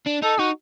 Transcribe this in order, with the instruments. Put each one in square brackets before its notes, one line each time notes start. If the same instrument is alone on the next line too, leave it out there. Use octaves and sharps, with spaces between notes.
[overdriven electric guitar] D4
[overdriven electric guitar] D#4 [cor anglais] A4
[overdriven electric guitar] D#4 [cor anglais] F#4